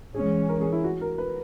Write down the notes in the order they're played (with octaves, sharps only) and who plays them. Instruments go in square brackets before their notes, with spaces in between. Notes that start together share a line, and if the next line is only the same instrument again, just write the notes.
[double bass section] E3 G#3 C#4 [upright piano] G#4
[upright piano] A#4
G#4
E4
F#4
A#4
B4